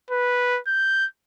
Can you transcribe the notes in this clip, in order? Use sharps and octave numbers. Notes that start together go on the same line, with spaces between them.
B4
G6